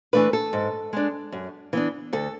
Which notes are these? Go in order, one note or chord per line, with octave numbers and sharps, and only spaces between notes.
E3 A3 D4 B4
A4
G#2
G#3 D4
F#2
E3 B3 D4
D2 A4